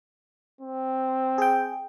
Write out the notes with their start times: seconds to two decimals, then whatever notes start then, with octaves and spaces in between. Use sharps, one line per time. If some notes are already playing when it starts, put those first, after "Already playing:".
0.61 C4
1.38 G#4 G5